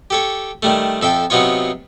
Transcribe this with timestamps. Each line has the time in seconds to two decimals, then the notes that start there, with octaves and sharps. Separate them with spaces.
0.10 G4 A4 C#5
0.62 D#3 G3 A3
1.02 F2 A4 E5 G5
1.30 C3 F#3 B3 D#4 F4 C#5